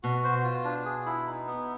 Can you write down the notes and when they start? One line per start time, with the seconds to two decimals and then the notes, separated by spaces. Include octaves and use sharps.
0.03 B2 F#4
0.24 C5
0.44 F4
0.65 D4
0.85 G#4
1.06 E4
1.27 D#4
1.47 B3